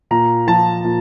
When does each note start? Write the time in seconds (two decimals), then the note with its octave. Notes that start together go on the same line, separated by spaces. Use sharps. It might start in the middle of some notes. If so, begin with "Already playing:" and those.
0.11 A#2 A#5
0.47 F3 A5
0.84 A#2